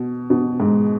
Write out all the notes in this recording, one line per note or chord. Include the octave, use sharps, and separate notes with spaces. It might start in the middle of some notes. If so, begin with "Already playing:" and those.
Already playing: B2
B2
G#2